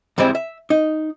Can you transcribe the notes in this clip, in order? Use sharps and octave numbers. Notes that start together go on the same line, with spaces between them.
G#2 E3 G3 G#3 C4 E4
E5
D#4